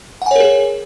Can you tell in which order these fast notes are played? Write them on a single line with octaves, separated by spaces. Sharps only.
F#5 G#5 C#5 A#4 G#4